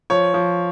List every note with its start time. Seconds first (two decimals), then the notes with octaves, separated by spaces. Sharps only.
0.10 F3 C#5
0.34 F3